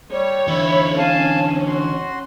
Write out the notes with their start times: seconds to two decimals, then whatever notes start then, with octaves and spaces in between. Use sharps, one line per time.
0.10 G3 C#5
0.48 D3 E3 E5 B5
0.98 C#4 F5 G#5 A5
1.67 F#4 C6